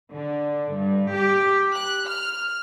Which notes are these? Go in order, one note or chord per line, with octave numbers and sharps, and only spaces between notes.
D3
G2
G4
F#6
F6